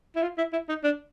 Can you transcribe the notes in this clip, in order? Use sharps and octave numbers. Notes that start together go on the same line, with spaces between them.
E4
F4
E4
E4
D#4
D4